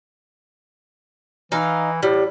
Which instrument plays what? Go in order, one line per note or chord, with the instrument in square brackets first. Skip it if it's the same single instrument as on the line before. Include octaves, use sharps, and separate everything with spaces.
[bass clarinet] E3 [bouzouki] D#4 F5
[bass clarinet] A2 [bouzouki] G3